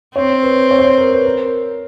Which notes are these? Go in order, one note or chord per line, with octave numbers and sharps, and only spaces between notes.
C4 C#5
B4
C#5
C5
C#5
A#4
B4
A#4